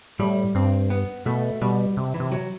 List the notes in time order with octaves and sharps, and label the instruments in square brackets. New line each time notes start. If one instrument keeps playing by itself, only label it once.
[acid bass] A2 [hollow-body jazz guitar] G3
[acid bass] G2 [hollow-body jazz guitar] C4
[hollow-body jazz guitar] B3
[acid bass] B2 [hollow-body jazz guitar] A3
[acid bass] B2 [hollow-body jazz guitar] G3
[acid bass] C3
[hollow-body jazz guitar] E3
[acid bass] C3
[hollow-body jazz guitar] F#3